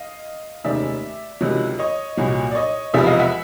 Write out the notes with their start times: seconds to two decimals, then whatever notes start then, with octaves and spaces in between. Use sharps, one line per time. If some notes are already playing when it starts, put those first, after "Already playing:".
Already playing: D#5 F5
0.64 F1 D#2 D#3 G#3 C#4 D5 E5
1.41 C#2 C3 D#3 F#3
1.79 C#5 D#5
2.17 C2 A#2 F#3
2.51 D5
2.55 C#5 D#5
2.93 E1 E2 C3 F3 D5 E5
3.06 D#5 F5
3.20 E5 F#5